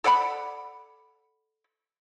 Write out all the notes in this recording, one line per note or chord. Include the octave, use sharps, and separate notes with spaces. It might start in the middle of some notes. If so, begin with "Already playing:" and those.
A4 D5 F#5 B5